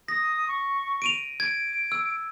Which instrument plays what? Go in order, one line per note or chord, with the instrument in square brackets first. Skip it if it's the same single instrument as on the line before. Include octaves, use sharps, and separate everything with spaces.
[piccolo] D#6 [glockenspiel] A#6
[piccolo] C#6
[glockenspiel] D7 D#7 F7
[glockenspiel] G#6 [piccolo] D7
[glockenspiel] E6